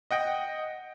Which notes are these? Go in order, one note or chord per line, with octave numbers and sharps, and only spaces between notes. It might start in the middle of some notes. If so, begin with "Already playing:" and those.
D#5 F#5 G5 A#6